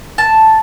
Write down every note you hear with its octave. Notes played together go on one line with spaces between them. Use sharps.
A5